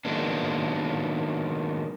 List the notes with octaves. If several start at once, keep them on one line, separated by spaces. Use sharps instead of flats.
D#3 F#3 G#3 A#3 B3 D4